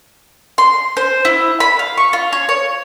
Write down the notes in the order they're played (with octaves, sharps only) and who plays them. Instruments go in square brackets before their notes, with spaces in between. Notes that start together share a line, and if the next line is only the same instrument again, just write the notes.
[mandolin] C6
C5
E4
B5
F5
C#6
F4
C#5
C#5